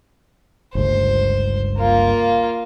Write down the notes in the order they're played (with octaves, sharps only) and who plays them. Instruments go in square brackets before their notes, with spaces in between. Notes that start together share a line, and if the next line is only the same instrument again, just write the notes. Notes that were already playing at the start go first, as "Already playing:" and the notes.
[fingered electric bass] G1 C#2 A3 [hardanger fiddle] C5
[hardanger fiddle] A#3 F4